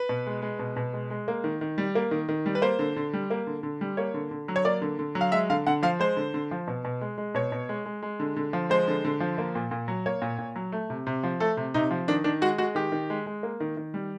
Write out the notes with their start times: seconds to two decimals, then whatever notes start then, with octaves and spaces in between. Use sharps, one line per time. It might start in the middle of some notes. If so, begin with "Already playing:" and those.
Already playing: B4
0.09 B2
0.26 G#3
0.42 G#3
0.59 B2
0.76 B2
0.93 G#3
1.10 G#3
1.28 A#3
1.44 D#3
1.61 D#3
1.78 G3
1.95 A#3
2.11 D#3
2.29 D#3
2.46 G3
2.55 B4
2.62 A#3 C5
2.79 D3
2.96 D3
3.13 G3
3.30 A#3
3.47 D3
3.63 D3
3.81 G3
3.97 A#3 C#5
4.14 D3
4.31 D3
4.48 F#3
4.56 C#5
4.65 A#3 D5
4.82 D3
4.99 D3
5.15 F#3
5.21 F5
5.32 G#3 E5
5.50 D3 F5
5.67 D3 F#5
5.83 F3 F5
5.99 G#3 C5
6.17 D3
6.34 D3
6.51 F3
6.68 B2
6.85 B2
7.01 G#3
7.18 G#3
7.35 B2 C#5
7.52 B2
7.69 G#3
7.85 G#3
8.02 G#3
8.20 D3
8.37 D3
8.53 F3
8.70 G#3 C5
8.88 D3
9.05 D3
9.20 F3
9.38 A#3
9.55 A#2
9.71 A#2
9.88 F#3
10.06 A#3 C#5
10.22 A#2
10.38 A#2
10.56 F#3
10.72 A3
10.90 C3
11.07 C3
11.23 F3
11.40 A3 A4
11.57 C3
11.74 C3 D#4
11.91 F3
12.08 D#3 D4
12.24 D#3 D4
12.41 G#3 F#4
12.58 G#3 F#4
12.75 D#3 G4
12.92 D#3
13.10 G#3
13.26 G#3
13.43 A#3
13.60 D#3
13.77 D#3
13.94 G3